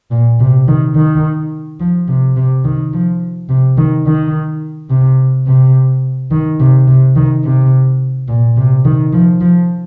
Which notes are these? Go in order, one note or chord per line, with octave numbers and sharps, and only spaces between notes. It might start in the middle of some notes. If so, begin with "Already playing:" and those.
A#2
C3
D#3
D#3
F3
C3
C3
D#3
F3
C3
D#3
D#3
C3
C3
D#3
C3
C3
D#3
C3
A#2
C3
D#3
F3
F3